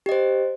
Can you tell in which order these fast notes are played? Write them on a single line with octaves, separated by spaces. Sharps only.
G4 D#5 C5